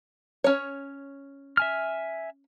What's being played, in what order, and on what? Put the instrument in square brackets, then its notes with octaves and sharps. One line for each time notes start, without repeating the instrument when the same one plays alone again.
[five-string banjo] C#4 C#5
[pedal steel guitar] E5 G#5 F6